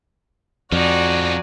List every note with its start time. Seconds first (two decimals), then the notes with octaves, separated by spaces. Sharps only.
0.72 F2 F3 D#4 F#4 D5 G#5